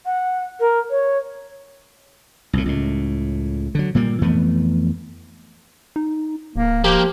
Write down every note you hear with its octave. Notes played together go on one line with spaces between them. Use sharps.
F#5
A#4
C#5
C2 A2
C#2 A2
D3 F#3
A#2 G3 A#3
F2 E3 A3 B3
D#4
D1 A#3
F3 A#3 G4